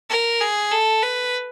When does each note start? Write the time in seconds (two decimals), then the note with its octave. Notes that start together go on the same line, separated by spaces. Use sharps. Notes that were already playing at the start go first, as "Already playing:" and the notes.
0.10 A#4
0.41 G#4
0.71 A4
1.02 B4